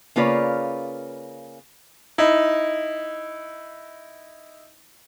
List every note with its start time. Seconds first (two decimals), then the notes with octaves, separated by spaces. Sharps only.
0.16 C#3 A#3 F4 B4 C#5 D5
2.18 D#4 E4